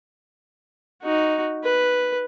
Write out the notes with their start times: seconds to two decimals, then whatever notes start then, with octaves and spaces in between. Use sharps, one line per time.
1.03 D#4 F#4
1.64 B4